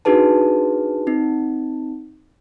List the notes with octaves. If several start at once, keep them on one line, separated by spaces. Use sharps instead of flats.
D4 D#4 F#4 G#4 B4 A5
C4 D#4